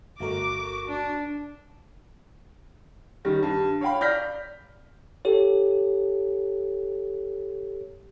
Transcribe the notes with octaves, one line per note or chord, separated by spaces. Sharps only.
G1 A3 F#4 A#4 D6
D4
D#3 G3 C#4
G2
C#5 F5 G5 B5
D5 F6 G6 A#6 B6
G4 A4 C#5